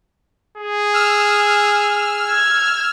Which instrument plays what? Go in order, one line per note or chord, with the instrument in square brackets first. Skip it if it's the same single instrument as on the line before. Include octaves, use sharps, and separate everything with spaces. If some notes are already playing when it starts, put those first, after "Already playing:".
[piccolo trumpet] G#4
[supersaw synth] E6 F6
[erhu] G#6